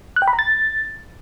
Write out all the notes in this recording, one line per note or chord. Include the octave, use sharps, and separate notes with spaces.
F#6
G5
B5
A#5
A6